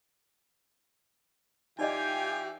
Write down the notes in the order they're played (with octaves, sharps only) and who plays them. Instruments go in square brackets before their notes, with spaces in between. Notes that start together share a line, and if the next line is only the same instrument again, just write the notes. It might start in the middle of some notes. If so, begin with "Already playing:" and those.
[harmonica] E3 F4 G#5 [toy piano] D#4 D5 D#5 [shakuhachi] G4 [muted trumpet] G5